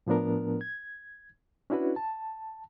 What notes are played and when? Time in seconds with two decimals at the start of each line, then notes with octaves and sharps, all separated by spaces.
0.07 A2 F3 B3 D4 A#4
0.61 G#6
1.70 C#4 D4 E4 F#4 B4
1.96 A5